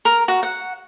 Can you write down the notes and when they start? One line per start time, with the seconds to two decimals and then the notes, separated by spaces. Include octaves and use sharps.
0.05 A#4
0.28 F#4
0.43 F#5